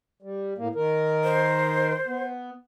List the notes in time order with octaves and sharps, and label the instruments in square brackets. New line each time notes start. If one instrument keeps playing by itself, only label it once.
[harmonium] G3
A2 A#3
D#3 A#4
[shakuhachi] C5
[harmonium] B3